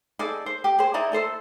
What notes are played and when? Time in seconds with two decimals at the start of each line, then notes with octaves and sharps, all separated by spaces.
0.19 D#4 G#4 A4 D5
0.46 C5
0.64 G4
0.79 G#4 C5
0.94 D#4 E4 D5 A#5
1.12 D#4 A4 C5 E5